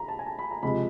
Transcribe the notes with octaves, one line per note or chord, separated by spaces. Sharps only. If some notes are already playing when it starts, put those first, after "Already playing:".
Already playing: A#5 B5
A5
G#5
A5
B5
A#5
C#2 C3 F3 G#3 B5